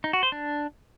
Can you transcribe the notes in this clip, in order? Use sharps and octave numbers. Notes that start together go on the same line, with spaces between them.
D#4
F#4
C5
D4